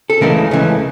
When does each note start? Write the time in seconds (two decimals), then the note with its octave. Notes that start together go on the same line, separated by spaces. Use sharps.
0.10 A4
0.21 C#2 C#3 E3 A3 A#4
0.51 C#2 C#3 E3 A3